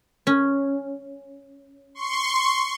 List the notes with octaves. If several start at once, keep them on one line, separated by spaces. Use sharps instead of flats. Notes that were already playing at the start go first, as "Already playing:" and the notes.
C#4
C6 C#6